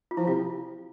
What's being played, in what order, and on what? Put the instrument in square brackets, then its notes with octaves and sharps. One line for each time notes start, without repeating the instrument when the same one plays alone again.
[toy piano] F4
[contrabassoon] F3 [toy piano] E4
[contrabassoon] C3 [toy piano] F4